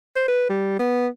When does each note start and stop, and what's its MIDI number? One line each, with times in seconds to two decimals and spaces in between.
0.16 0.24 72
0.28 0.45 71
0.49 0.78 55
0.79 1.07 59